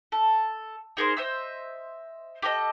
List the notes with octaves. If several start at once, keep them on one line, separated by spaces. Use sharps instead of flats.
A4
D#4 G#4 A#4 C5
C5 D#5 E5 E6
G4 A4 A#4 D#5